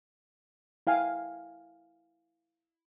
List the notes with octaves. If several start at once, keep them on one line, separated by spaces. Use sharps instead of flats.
E4 F5 G5 G#5